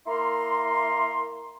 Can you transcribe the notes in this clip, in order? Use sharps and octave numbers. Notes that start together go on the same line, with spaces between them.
A#3 E4 A#5 C6